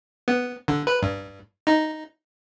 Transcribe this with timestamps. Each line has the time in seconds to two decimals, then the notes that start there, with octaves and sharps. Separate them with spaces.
0.28 B3
0.68 D3
0.87 B4
1.02 G2
1.67 D#4